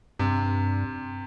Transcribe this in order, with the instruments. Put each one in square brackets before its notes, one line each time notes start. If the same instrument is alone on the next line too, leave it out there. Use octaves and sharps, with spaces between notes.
[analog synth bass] G2 [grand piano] C3